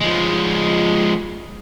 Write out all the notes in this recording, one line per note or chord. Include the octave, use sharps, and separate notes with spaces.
F3 G#3